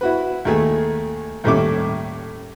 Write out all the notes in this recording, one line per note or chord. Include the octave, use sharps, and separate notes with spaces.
E4 F#4 B4
D#2 A3 G#4
D#2 A2 G3 C#4 E5 D6